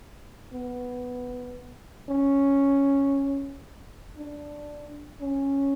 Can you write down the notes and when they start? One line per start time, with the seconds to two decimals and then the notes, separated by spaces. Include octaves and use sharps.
0.53 B3
2.09 C#4
4.17 D4
5.21 C#4